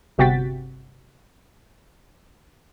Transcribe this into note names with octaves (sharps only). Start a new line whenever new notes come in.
G1 C3 F#4 G5 A6 B6